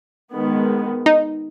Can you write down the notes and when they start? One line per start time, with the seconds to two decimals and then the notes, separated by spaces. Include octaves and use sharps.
0.33 D#3 G#3 B3
1.06 D#4